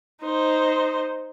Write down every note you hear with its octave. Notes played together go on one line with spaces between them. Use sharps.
D#4 C5